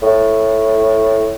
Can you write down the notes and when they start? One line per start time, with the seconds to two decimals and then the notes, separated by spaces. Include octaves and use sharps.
0.02 A2